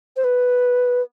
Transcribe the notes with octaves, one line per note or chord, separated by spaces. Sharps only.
C5
B4